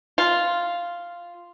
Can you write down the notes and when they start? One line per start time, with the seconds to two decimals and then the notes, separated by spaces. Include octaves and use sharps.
0.18 F4